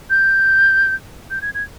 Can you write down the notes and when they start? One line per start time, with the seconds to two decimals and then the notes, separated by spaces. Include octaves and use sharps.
0.10 G6
1.31 G6
1.42 G#6
1.55 G#6